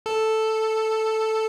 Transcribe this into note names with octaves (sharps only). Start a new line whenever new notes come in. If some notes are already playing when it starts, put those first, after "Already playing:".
A4